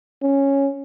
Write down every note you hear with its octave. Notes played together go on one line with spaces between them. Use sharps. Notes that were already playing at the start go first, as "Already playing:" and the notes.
C#4